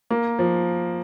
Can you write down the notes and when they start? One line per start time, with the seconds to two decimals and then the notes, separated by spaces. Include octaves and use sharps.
0.10 A#3
0.39 F3